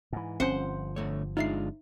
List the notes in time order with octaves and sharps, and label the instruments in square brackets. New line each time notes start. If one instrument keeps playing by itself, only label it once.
[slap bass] G#2 E3
[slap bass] G1 F3 [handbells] C4 C#4 [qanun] C5 F#5
[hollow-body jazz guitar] D3 A3 C#5
[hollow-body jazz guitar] G#3 D4 F4 [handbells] D#4 E5 C7